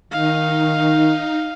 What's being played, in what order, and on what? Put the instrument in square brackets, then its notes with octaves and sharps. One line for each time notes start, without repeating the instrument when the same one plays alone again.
[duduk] D#3 [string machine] D#4 [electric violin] F5